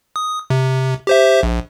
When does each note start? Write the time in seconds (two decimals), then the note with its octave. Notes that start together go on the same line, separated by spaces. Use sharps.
0.16 D#6
0.50 C3
1.07 G4 C5 E5
1.43 A#1